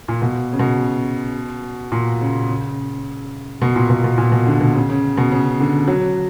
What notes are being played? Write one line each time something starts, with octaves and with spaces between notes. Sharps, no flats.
A#2
B2
C#3
B2
A#2
C#3
C#3
B2
A#2
B2
B2
A#2
B2
D3
B2
C#3
C#3
B2
C#3
D3
F#3